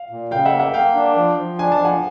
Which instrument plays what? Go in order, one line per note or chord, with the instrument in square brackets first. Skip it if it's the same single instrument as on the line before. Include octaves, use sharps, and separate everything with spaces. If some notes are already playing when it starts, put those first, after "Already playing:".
Already playing: [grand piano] F5
[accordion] A#2
[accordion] C#3 [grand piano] F5 G5
[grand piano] E5 F#5
[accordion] A#3
[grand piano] E5 F#5
[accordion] A#3 [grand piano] F5 G5
[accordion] D4
F3
F3
[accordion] D4 [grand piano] G#5
[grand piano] A5
[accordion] F3 [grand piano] F#5 G#5